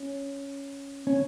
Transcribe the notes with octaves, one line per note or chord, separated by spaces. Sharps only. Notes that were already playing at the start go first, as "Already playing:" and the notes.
Already playing: C#4
C#4